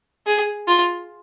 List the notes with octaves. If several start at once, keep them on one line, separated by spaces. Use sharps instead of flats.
G#4
F4